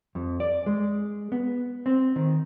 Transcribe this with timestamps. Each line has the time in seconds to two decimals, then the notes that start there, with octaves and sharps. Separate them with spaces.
0.15 F2
0.40 D5
0.66 G#3
1.32 B3
1.86 C4
2.16 D#3